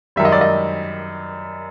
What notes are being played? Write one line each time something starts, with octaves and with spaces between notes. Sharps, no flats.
F#2 D#3 G3 E5
D#5
D5
D#5